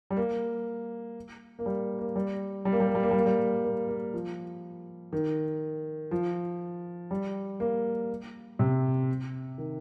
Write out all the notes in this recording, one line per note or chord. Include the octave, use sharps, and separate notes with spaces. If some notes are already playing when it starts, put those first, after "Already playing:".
G3
A#3
A#3
G3
A#3
G3
G3
A#3
G3
A#3
G3
A#3
G3
A#3
G3
A#3
A#3
F3
D#3
F3
G3
A#3
C3
D#3